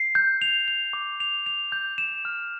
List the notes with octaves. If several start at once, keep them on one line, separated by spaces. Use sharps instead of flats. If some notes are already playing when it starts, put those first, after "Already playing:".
Already playing: C7
G6
F7
F7
D6
F7
F7
G6
E7
F6